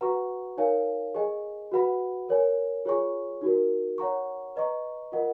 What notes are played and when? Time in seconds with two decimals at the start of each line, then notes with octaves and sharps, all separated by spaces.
0.01 F#4 B4 F#5 A#5 C#6
0.57 D#4 A#4 C#5 F5 G#5
1.15 G#4 D#5 G#5
1.72 F#4 B4 F#5 B5
2.29 A#4 C#5 G#5
2.85 F4 G#4 C#5 G#5 C#6
3.41 D#4 F#4 A#4
3.98 C#5 F#5 A#5 C#6
4.56 B4 D#5 A#5 C#6
5.12 F4 A#4 D#5 F#5